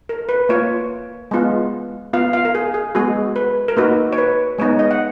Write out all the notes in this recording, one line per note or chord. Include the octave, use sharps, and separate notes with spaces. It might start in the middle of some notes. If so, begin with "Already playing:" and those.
A#4
B4
A#3 F4 C#5
G#3 B3 F4
B3 F4 F5
F5
A#4
G#4
G#4
G#3 B3 F#4 G#4
B4
A#4
A#3 D#4 F#4 B4
C#5
B4
G#3 B3 D#4 C#5
D#5
F#5